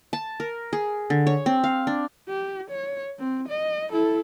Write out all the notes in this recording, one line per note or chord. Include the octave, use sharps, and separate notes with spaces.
A5
A#4
G#4
D3
C#5
C4
F5
D4
G4
C#5
C4
D#5
E4 A4